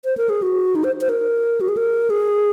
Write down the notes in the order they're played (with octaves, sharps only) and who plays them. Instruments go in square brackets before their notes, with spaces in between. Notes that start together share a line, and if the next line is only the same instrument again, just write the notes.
[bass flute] C5
A#4
G#4
F#4
D#4
C5
C5
A#4
F#4
G#4
A#4
G#4